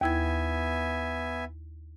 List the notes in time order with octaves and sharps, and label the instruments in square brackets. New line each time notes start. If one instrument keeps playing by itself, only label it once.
[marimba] D#2 E4 G#6 [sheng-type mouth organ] B3 E5 G#5